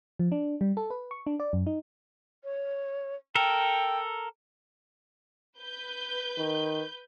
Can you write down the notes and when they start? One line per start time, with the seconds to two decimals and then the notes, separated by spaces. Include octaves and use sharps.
0.19 F3
0.32 D4
0.61 G3
0.77 A4
0.90 B4
1.11 C#6
1.27 D4
1.40 D5
1.53 F#2
1.67 D#4
2.44 C#5
3.35 A4 A#4 G5
5.59 B4 G6
6.38 D#3